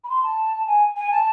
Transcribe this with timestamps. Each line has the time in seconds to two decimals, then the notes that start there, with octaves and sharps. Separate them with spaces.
0.04 B5
0.09 C6
0.23 A5
0.67 G#5
0.97 G#5
1.11 A5